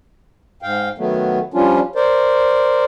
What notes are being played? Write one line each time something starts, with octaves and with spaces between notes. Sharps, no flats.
G#2 F5 G5
D#3 F#3 A3 B3
F3 G3 C#4 D4 F4
A#4 C5 D5